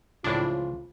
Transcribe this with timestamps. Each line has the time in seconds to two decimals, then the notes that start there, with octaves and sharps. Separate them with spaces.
0.24 C#2 A2 E3 F3 D4 F4